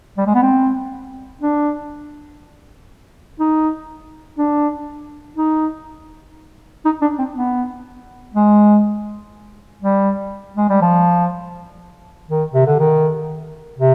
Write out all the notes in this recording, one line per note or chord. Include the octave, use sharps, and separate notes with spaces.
G3
G#3
B3
C4
D4
D#4
D4
D#4
D#4
D4
C4
B3
G#3
G3
G#3
G3
F3
D#3
C3
D3
D#3
C3